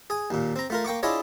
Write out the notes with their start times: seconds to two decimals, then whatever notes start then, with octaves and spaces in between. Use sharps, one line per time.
0.10 G#4 G#5
0.30 D#2 A#2
0.56 C4 A#5
0.70 A3 F4 A#4
0.85 A#3 G5 C#6 D6
1.03 D4 E4 F4 G#4 C#5 D#5